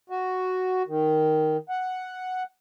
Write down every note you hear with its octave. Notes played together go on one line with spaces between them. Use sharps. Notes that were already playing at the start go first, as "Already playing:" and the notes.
F#4
D#3
F#5